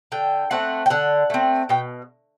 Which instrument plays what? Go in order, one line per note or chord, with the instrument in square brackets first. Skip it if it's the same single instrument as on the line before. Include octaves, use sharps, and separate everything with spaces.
[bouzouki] D3 G5
A3 C4 F#5
G5
D3 F#5
A3 C4
B2 G5